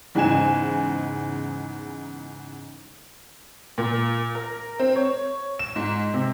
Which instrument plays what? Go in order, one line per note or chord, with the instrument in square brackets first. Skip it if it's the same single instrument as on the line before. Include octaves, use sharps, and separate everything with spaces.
[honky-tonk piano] E2 G#2 C#3 D#4 G#5 E7
A#2
A#4
C4
C#5
E7
G#2
C3